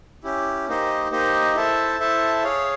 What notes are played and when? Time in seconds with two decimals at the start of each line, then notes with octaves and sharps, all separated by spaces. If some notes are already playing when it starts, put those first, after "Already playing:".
0.24 C#4 E4 G4
0.68 A#3 D#4 G4 C5 D#5
1.11 A#3 D#4 G4 C5 D#5
1.55 E4 A4 C5 E5 A5
2.00 E4 A4 C5 E5 A5
2.44 G#4 C#5 F5